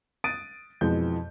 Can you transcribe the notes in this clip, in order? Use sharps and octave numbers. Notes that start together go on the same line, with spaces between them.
D#6 F#6 A6 D7 D#7
F2 B2 E3 G#3 G6